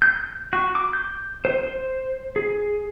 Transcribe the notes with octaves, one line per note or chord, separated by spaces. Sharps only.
G6
F#4
D6
G6
C5
C5
G#4